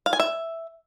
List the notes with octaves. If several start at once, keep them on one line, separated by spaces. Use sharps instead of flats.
F5
G#5
E5